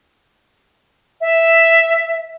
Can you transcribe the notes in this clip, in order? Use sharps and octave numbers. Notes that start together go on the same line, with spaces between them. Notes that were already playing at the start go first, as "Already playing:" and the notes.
E5